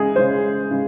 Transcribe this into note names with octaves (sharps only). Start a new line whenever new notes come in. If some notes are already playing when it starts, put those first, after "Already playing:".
Already playing: C#3 G#3 G#4
C#3 G#3 C#4 C5
C#3 G#3